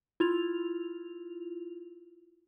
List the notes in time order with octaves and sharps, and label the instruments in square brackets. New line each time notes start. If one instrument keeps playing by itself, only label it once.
[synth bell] E4 F4 F7